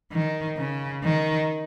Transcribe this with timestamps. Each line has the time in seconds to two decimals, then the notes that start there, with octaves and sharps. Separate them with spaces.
0.12 D#3
0.57 C#3
1.03 D#3